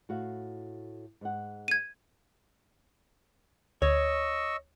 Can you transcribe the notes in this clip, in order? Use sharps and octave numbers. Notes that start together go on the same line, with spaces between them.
A2 F#4 F5
G#2 F#5
G#6 D#7
D2 C#5 D#5 C#6 E6